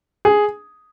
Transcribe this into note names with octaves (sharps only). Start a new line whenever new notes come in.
G#4